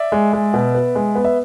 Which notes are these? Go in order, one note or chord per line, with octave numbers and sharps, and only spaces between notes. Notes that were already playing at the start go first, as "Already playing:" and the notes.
Already playing: D5 E5
G#3
G#3
B2
B3
G#3
B3
E5